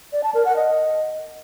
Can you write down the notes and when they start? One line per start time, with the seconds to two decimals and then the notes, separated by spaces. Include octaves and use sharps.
0.13 D5
0.24 A5
0.34 A#4
0.45 F#5
0.56 D#5